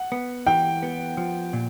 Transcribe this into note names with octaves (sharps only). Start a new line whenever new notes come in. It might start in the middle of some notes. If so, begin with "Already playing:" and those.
Already playing: F#5
B3
E3 G5
B3
F3
A#2